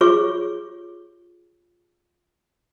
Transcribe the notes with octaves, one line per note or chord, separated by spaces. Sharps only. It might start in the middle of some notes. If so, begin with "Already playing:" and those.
F4 G4 G#4 C#5 C#6